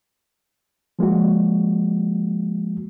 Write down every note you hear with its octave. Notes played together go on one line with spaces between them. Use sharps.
F3 G#3 A#3 F#4